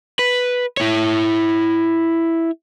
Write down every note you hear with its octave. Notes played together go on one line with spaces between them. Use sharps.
B4
E4 C#5